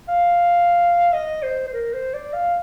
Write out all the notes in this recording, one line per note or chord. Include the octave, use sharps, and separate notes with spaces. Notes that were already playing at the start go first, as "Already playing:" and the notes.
F5
D#5
C5
C5
A#4
C5
D5
F5